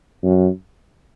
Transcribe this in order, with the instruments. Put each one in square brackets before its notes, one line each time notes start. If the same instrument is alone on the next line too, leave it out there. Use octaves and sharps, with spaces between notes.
[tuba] F#2